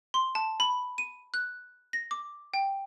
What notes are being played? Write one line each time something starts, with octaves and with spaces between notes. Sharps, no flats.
C6
A5
B5
D#7
F#6
A#6
D6
G5